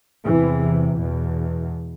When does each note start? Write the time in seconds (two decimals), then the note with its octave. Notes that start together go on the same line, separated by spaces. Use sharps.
0.24 E2 C3 E3
0.95 E2 B2